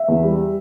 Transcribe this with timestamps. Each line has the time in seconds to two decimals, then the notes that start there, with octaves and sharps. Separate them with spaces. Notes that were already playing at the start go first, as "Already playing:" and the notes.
Already playing: E5
0.08 E2
0.23 G3